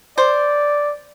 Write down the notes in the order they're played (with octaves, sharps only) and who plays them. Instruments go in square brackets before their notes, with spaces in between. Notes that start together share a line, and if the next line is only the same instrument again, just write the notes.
[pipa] C5 [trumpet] D5